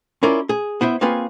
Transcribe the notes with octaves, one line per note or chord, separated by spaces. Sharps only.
C#4 E4 F4 A#4 D5
G#4
B3 E4 C5 E5
A#3 C4 F4 G#4 B4 C#5